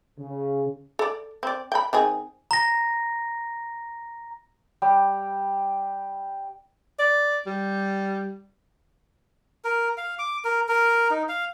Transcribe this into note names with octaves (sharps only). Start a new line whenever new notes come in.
C#3
A4 D5
C4 D5
G5 B5
D#3 C4 G#4
A#5 A#6
G3 G4
D5
G3
A#4
F5
D6
A#4
A#4
D#4
F5